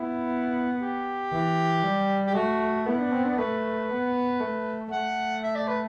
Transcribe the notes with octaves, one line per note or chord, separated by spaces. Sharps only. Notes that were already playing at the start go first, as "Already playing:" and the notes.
Already playing: B3 E4
G4
E3
G3
G4
A3 F#4
B3 E4
D4
C4
D4
A3 B4
B3
A3
A3 F#5
E5
D5
B4